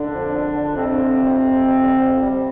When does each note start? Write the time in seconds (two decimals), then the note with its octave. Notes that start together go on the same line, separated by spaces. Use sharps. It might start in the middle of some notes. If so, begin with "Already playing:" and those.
Already playing: D3 D4
0.14 F2
0.35 D3
0.56 D3
0.75 F2 C3 C4
0.97 D3
1.18 F2
1.39 F2
1.60 F2
1.81 D3
2.01 F2
2.21 G3